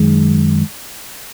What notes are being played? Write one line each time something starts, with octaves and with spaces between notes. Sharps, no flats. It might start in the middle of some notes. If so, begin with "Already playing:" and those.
Already playing: F#2 D#3 G#3